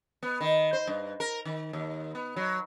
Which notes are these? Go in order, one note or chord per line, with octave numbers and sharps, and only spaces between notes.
B3
D#3
C5
G2
A#4
D#3
D#2
B3
F#3